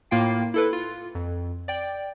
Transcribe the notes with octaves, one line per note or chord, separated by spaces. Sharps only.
A2 A#3 F4 G5 C7
E4 A4 B4
F4
F2
D5 G5